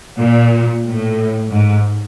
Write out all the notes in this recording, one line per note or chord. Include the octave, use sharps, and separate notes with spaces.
A#2
A2
G#2